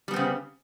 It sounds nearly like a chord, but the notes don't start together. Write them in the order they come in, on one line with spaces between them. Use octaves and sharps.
G3 B3 C4 C#3